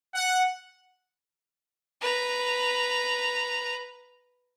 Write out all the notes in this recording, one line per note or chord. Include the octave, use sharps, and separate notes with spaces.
F#5
B4 A#5